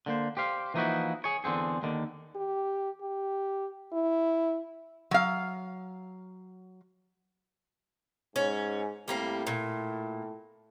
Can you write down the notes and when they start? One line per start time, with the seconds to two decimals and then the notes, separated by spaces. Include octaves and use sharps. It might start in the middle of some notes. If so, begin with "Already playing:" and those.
0.06 D3 A#3 C5
0.37 G4 C5 F5
0.74 E3 F3 A#3 D#4 E4 F#4
1.24 G#4 C#5
1.44 E2 D3 C4 G#4
1.83 D#2 D3 D#3
2.36 G4
3.01 G4
3.93 E4
5.11 F#3 F5
8.36 G#2 C#4
9.08 A2 G3 A#3 C4
9.47 A#2